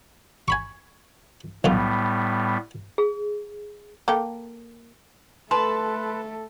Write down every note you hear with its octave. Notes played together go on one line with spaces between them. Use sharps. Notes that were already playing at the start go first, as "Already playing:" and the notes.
G#5 B5 C#6
B1 A2 G3 B3 F4 D#6
G#4
A#3 A4 G5
A3 A4 B4 A5 C6